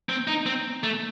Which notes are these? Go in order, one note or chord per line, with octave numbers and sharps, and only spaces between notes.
C4
D#4
C4
A3